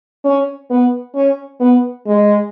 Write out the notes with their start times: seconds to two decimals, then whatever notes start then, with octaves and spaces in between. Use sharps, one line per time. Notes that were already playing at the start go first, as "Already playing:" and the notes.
0.24 C#4
0.70 B3
1.15 C#4
1.60 B3
2.07 G#3